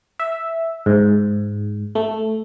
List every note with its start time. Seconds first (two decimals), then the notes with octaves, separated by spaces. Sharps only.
0.20 E5
0.86 G#2
1.95 A3